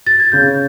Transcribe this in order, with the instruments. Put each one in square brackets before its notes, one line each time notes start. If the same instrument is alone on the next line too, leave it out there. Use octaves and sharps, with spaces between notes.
[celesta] A6
G#6
[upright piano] C#3 [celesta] G6